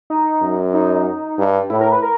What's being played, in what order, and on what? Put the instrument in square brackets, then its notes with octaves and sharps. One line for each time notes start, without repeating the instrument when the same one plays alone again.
[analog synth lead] D#4
[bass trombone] F#2
[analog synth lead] D#4
[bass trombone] G2
[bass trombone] A2 [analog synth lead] E4
[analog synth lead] A#4
B4
A#4